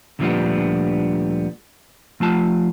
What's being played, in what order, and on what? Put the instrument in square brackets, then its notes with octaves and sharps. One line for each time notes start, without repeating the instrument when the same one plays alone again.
[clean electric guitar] D2 A#2 D3 F3 G3 B3
F3 A3 F4 A5